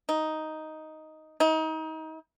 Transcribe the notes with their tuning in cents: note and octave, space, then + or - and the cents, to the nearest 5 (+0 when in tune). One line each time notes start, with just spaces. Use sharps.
D#4 +5
D#4 +30